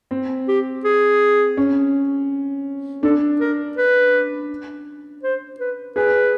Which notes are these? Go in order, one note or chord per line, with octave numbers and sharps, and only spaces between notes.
C4
G4
G#4
C#4
D4 A4
A#4
B4
C5
B4
G#4 B4